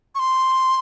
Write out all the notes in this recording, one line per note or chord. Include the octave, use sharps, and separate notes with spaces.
C#6
C6